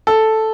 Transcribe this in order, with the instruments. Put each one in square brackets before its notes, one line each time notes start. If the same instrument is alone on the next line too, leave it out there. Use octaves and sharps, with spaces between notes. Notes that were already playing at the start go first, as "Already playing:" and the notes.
[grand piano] A4